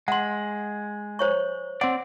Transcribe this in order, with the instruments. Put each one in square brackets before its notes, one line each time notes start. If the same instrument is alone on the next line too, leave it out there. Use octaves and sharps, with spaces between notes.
[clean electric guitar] G#3 [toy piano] F#5 C6
[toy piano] C5 C#5 C#6
[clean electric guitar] C4 D5 [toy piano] F#5